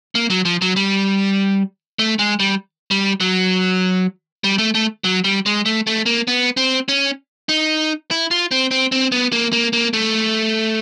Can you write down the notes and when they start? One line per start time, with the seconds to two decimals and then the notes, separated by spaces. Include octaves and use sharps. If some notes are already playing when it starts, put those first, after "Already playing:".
0.15 A#3
0.30 F#3
0.45 F3
0.62 F#3
0.76 G3
1.99 A3
2.19 G#3
2.40 G3
2.91 G3
3.20 F#3
4.44 G3
4.58 A3
4.75 A3
5.04 F#3
5.24 G3
5.46 G#3
5.66 A3
5.87 A3
6.06 A#3
6.28 B3
6.57 C4
6.89 C#4
7.49 D#4
8.11 E4
8.31 F4
8.51 C4
8.71 C4
8.92 C4
9.12 B3
9.32 A#3
9.53 A#3
9.73 A#3
9.93 A3